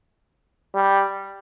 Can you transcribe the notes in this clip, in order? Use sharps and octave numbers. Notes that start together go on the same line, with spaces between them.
G3